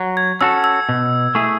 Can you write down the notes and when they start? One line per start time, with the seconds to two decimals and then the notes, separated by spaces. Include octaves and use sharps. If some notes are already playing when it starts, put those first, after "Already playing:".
Already playing: F#3
0.17 G#6
0.41 C#4 F#4 A4 E6
0.64 E6
0.89 B2
1.35 A3 E4 G#4